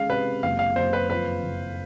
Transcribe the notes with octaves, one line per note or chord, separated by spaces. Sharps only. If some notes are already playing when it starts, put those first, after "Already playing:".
Already playing: C#3 G#3 F5
C3 B4
F#1 F5
F5
F#1 C5
B4
F2 B4
F#1